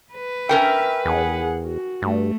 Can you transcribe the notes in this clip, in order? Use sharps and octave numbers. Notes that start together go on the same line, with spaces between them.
B4
C#4 A#4 E5 G5
E2 G#4 F#5
F#4
G2 A3